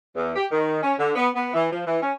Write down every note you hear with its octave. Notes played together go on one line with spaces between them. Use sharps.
E2
G4
D#3
C#4
D3
B3
B3
E3
F3
E3
C#4